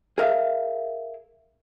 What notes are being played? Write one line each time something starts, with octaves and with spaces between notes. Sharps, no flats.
G#4 A#4 E5 F5